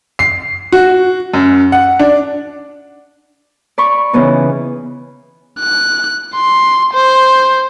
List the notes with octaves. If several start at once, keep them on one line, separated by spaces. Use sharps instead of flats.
C7
F#4
F#2
F#5
D4
D5 B5 C#6
C#3 E3 B3 D#4
F#6
C6
C5